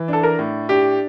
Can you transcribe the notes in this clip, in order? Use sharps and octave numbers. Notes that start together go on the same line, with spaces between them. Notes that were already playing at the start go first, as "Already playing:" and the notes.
Already playing: E3
D4 A4
A#4
A2
D4 G4